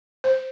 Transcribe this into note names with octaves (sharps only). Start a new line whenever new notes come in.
C5